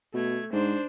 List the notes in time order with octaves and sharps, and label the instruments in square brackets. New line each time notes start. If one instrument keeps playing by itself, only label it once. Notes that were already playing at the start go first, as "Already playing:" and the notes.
[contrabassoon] B2 [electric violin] A3 G#6
[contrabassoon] G#2 [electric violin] D4 C5